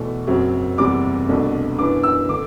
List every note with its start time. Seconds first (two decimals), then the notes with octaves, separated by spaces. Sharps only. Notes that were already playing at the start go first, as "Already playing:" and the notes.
Already playing: E2 B2 A3
0.27 F#1 F#2 F#3 C4
0.78 F#1 E2 C3 G3 D6
1.29 C2 B2 A3 D4
1.79 F#2 E3 B3 D4 D6
2.03 E6
2.29 D3 D6